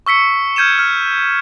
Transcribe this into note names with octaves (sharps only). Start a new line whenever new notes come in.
C#6 E6 B6 C#7
F6 G6 G#6 D#7 E7
F6